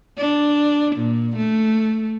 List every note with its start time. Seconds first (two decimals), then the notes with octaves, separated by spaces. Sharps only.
0.18 D4
0.96 A#2
1.36 A3